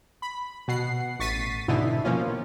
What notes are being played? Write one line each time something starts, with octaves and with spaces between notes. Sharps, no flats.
B5
B2 F#5 C7
A1 C#6 A6 B6 C7 D#7
G#2 B2 D3 E3 D#4 E4
B2 F3 A#3 C#4 F4